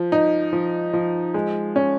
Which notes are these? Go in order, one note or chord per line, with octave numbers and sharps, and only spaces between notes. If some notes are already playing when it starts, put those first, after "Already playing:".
Already playing: F3
D#4
F3
F3
G#3
C#4